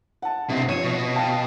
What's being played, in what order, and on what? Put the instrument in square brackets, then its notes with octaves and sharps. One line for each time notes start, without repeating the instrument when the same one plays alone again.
[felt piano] F#5 A5
[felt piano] C2 G2 [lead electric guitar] B2 C4
[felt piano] F3 D#7 E7 [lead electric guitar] C#5
[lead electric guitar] B2
[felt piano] F5 G5 A5